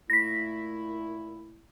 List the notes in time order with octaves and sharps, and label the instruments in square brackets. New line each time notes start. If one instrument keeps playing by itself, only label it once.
[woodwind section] A#2 A3 E4 [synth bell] A#6 B6